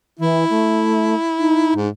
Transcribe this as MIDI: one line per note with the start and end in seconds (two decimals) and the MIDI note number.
0.19 0.44 52
0.19 1.74 64
0.50 1.15 57
1.39 1.81 63
1.76 1.88 44